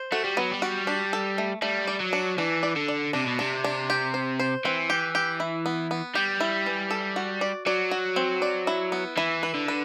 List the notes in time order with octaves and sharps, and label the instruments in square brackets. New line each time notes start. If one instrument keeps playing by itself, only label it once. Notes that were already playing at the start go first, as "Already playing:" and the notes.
Already playing: [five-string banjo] C5
[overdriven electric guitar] A3 [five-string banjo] F#4
[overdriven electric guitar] G3
[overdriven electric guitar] F#3 [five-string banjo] B3
[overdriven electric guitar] G3
[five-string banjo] F#4
D4
A4
A3
[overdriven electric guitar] G3 [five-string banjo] A3
[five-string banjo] D5
[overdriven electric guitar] F#3
[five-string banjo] D4
[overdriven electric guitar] E3 [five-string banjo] D4
[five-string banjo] D5
[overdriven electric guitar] D3
[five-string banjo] D5
[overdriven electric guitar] C3 [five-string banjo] D4
[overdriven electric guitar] B2
[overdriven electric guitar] C3 [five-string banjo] D4
[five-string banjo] D4
G4
C5
C5
[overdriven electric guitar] E3 [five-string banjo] C4
[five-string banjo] G4
G4
E4
B3
B3
[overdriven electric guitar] G3 [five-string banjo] G4
[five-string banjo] E4
E3
A4
F#4
D5
[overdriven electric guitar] F#3 [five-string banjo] D5
[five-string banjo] F#4
C4
D5
E4
B3
[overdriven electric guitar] E3 [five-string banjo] E4
[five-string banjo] B4
[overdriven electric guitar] D3
[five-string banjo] B4